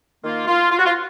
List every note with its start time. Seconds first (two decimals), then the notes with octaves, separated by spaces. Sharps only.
0.23 D#3 A#3 F4
0.47 F4
0.71 F4
0.78 F#4
0.85 F4